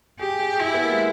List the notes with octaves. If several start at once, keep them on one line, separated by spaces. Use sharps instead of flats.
G4 G#4
G#4
G#4
E4 G4
B3
A#3
G#3